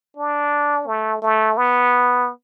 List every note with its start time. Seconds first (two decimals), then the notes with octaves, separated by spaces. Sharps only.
0.17 D4
0.87 A3
1.22 A3
1.57 B3